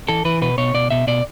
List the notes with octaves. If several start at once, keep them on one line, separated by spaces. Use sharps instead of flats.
E3 A4
E3 B4
B2 B4
B2 C#5
B2 D5
B2 E5
B2 D5